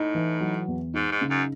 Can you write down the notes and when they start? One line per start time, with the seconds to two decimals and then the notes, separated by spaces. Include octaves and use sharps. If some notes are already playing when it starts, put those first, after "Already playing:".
Already playing: A2 D#4
0.15 E3
0.40 F#3
0.68 E2
0.94 G#2 D#4
1.11 G#2
1.21 C#3
1.30 F#2